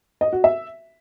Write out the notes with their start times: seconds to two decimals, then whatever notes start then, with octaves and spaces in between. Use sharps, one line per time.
0.21 D#5
0.33 F#4
0.44 E5